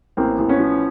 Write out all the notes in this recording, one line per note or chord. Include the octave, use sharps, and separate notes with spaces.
A1 A#3 C4
A1
B3 C#4
F3